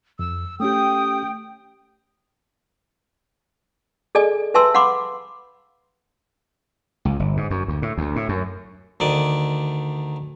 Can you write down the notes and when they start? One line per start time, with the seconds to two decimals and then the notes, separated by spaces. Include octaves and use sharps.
0.19 F2 E6
0.60 A3 C#4 G4 G5 D#6
4.15 G#4 A4 D5 D#5 G#5
4.54 B4 E5 G#5 A5 C6 E6
4.74 F5 F#5 B5 C6 D6
7.05 C#2
7.19 G1
7.37 G#2
7.50 F#2
7.68 D2
7.82 A2
7.98 D2
8.16 A2
8.29 F#2
9.00 D2 D#3 D5